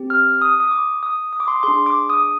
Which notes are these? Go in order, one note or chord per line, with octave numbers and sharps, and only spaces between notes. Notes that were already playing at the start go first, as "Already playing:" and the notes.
Already playing: C4 G4
F6
D#6
D#6
D6
D#6
D#6
D6
C6
D6
D4 G#4 C6
D6
D#6